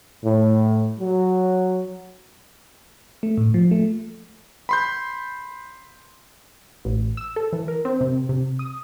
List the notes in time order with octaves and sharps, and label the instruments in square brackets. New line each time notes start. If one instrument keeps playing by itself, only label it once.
[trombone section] A2
F#3
[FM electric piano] A3
A2
F3
A3
[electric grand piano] B5 C6 G6
[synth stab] A1
E6
A4
E3
A#4
C4
C3
C3
D#6